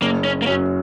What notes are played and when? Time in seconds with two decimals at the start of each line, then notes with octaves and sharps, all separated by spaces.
0.01 F#1 A#3
0.24 C#4
0.42 A#3
0.46 F#2 F#3 C#4